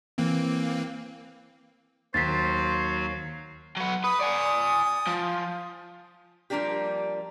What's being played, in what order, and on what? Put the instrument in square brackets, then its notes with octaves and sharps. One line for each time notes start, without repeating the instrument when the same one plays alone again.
[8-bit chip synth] E3 A#3 C4
[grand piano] D#2 [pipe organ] F#3 F#4 F5 [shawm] C5 [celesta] A6 B6
[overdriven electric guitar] F#3 B3
[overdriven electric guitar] B4 [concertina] D#6
[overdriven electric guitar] D5 G#5
F3
[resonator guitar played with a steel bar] F3 G3 A#3 D4 G4